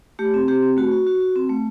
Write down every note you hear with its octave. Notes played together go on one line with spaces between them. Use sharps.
A3 G4
C4
C4 G4
C4
A3 F#4
F#4
F#4
F#4
C4
A3